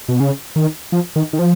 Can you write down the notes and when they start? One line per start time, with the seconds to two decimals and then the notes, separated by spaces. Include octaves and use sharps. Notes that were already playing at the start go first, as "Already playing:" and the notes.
0.08 B2
0.20 C#3
0.56 D#3
0.92 F3
1.16 D#3
1.33 D#3
1.39 F3